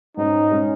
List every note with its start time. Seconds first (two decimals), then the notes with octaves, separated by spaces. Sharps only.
0.17 G#2 G#3 C#4 D#4
0.51 G#3 C#4